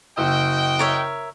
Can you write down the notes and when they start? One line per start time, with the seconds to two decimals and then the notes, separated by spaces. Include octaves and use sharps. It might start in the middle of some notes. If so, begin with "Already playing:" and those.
0.17 F#1 F#4 D#5 G5 E6
0.79 A#4 C#5 E5